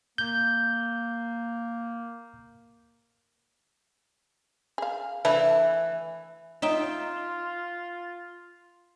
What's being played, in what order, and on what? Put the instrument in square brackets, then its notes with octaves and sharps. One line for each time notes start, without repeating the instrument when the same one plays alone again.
[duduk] A#3 [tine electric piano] G6
[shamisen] G#4 F5
[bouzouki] E3 [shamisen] A3 D4 E4
[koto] D#4 E5 G5 [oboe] F4